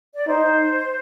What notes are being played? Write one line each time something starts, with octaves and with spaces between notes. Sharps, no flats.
D5
D#4 C5